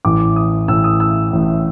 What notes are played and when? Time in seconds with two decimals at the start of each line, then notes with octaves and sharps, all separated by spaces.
0.05 A1 A2 E3 D6
0.36 D#6
0.68 A1 A2 E3 E6
0.84 D#6
1.00 E6
1.32 A1 A2 E3